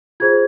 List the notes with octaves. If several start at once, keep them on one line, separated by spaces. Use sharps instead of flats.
F4 G#4 C5 G#6